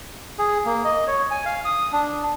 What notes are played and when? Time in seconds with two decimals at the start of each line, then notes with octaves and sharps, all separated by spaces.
0.39 G#4
0.65 A#3
0.85 D#5
1.07 C#5
1.31 G#5
1.45 F5
1.65 D#6
1.93 D4